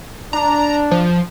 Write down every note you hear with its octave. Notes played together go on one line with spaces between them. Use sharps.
D4 A#5
F3